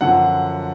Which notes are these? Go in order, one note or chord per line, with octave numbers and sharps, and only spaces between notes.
F#2 D3 F3 F#5